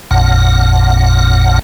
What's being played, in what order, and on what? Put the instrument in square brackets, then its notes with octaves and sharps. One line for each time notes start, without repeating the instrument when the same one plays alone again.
[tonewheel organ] A1 F2 A#2 F#5